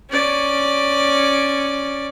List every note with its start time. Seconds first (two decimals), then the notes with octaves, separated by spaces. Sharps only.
0.10 C#4 D5